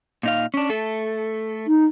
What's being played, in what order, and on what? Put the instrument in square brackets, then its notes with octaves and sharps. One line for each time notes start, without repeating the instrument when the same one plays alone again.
[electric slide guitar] A#2 D#4 F5
C#4 D4
A3 A4
[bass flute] D#4